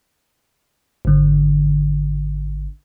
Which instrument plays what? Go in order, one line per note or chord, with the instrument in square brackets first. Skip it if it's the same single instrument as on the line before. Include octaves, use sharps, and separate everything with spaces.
[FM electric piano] G#1 D3